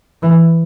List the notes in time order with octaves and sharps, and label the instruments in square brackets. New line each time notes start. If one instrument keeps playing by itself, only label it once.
[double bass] E3